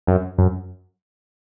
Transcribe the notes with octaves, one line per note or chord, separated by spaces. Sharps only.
F#2
F#2